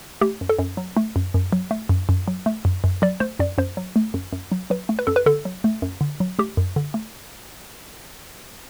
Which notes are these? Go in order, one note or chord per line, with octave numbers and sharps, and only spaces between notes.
A3 G4
F#2
A4
F#2
F#3
A3
F#2
F#2
F#3
A3
F#2
F#2
F#3
A3
F#2
F#2
F#3 D5
A3 C5
F#2 D5
F#2 C5
F#3
A3
F#2
F#2
F#3
F#3 B4
A3
B4
F#2 A4
B4
D3 A4
F#3
A3
F#2
D3
F#3
A3 G4
F#2
D3
A3